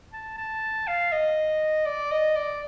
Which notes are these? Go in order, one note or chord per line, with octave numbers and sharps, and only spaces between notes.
A5
A5
F5
D#5
D5
D#5
D5